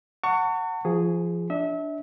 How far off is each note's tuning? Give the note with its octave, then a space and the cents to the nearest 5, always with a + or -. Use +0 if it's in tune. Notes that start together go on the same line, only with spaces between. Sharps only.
F#5 +0 A5 +45 C#6 +15
F3 -20 G#4 +0
D4 +0 E5 -30